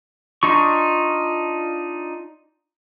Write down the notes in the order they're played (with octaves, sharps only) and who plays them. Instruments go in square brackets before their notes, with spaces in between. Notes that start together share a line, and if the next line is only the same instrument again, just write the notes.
[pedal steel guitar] D4 D#4 F4 C#6